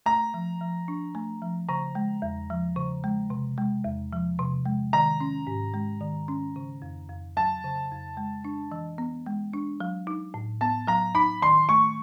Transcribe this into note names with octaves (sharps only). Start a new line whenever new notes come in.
A3 A#5
F3
F3
D4
A3
F3
C#3 A#5
G#3
E2
F3
C#3
G#3
C3
G#3
E2
F3
C3
G#3
D#3 A#5
C#4
G#2
G#3
D#3
C#4
C#3
F2
F2
F#3 A5
C#3
F2
G#3
D4
E3
B3
G#3
D4
F#3
D#4
A2
B3 A5
F#3 A#5
D#4 B5
D#3 C6
A3 C#6